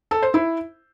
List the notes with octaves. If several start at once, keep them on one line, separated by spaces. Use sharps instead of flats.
A4
C5
E4